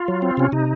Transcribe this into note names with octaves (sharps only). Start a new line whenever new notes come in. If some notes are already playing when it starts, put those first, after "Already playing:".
Already playing: F4
F#3
C4
C3 C#4
C3 D#4